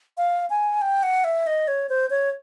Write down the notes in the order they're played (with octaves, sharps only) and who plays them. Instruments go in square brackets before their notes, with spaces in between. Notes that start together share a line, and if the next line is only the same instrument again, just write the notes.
[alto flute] F5
G#5
G5
F#5
E5
D#5
C#5
C5
C#5